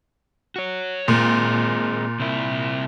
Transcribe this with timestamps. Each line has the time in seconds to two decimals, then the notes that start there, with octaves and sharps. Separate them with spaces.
0.56 F#4 C#5
1.08 A#2 G#3 C4
2.20 C3 E4